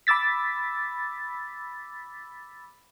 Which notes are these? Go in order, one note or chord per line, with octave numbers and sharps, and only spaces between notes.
B5 D6 E6 A6 B6